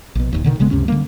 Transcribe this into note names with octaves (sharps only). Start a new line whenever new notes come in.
A#1 B2
E1 A1 D#2
B2 D3 D#3
A1 C#3 G#3 B3
C#2 F#2 C3 C#4
D3 G3 A#3